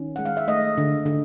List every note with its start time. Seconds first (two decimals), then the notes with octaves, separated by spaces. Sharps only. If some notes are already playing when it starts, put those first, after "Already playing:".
Already playing: D#3 C#4
0.16 G#3 F#5
0.25 F5
0.37 E5
0.48 A3 D#5
0.78 D3
1.06 D3